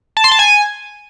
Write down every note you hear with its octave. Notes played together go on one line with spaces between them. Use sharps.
A5
C6
A5
G#5